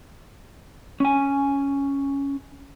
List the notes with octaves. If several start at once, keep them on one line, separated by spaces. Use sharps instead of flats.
C#4 G#5